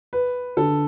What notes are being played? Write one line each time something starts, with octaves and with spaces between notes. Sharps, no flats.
B4
D3 A4